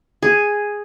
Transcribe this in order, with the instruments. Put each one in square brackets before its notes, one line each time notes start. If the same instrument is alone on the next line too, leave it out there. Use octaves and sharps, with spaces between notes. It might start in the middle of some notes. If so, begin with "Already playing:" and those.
[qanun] G#4